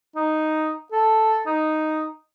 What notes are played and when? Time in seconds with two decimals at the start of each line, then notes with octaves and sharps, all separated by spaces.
0.16 D#4
0.92 A4
1.46 D#4